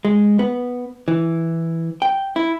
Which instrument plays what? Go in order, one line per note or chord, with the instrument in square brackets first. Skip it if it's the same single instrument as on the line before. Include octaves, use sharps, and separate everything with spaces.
[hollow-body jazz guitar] G#3
B3
E3
G5
E4